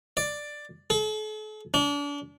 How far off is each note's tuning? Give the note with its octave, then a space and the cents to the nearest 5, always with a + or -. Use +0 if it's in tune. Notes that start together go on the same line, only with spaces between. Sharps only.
D5 +10
A4 -45
D4 -35